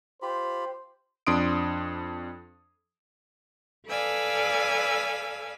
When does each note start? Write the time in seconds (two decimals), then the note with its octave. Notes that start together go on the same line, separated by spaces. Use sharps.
0.22 F4 G4 C5 B5
1.27 F2 D4 C6 D#6 D7
3.88 A4 B4 D5 F5 G#5 E6